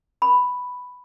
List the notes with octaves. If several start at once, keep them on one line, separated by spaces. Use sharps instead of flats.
B5